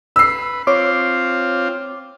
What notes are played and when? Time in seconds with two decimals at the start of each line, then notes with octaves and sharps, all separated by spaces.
0.16 B4 E6 C7
0.67 C4 F4 C#5 D6